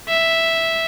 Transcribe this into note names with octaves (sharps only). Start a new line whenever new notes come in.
E5